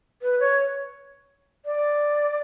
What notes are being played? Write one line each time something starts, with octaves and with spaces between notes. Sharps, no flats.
B4
C#5
D5